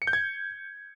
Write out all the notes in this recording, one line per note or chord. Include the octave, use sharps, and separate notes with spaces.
C#7
G6
G#6